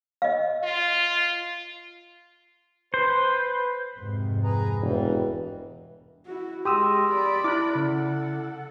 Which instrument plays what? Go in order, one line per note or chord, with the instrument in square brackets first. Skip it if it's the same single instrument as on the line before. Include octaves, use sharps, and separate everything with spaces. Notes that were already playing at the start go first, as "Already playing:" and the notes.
[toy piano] D#5 F5
[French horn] F4
[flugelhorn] B4 [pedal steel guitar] C5
[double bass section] F2 G#2 C3
[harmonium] G#4 B4 A#5
[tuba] E1 [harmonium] G2 E3 G3
[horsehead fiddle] E4 F#4
[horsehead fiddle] G#3 A#4 [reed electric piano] G4 D#6 E6 [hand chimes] C6
[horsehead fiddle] D5 B5
[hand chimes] E4 [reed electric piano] D6 F#6
[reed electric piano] C#3 [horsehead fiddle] A4 F#5